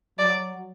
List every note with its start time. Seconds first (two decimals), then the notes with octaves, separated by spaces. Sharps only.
0.19 F#3 D5